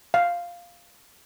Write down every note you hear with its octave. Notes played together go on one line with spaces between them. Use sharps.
F5